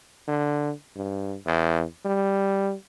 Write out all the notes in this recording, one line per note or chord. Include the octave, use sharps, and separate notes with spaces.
D3
G2
E2
G3